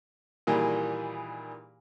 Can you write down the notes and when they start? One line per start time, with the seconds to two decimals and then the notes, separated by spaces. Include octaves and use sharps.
0.47 A#2 D#3 E3 G3 G#4